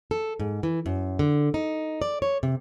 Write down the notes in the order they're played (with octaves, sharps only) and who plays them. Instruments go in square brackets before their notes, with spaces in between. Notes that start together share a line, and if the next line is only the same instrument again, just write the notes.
[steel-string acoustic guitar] A4
G#2
E3
F#2
D3
D#4
D5
C#5
C3